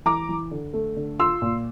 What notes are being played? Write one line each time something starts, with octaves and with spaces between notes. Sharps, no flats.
E3 A#5 D6
E3
D3
A3
D3
F4 C6 E6
A#2